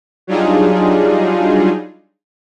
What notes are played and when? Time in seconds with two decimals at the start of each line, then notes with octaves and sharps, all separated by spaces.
0.27 F#3 G3 D4 D#4 F4 G#4